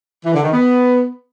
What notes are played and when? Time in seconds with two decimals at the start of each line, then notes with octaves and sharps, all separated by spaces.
0.25 E3
0.34 D3
0.43 D#3
0.53 B3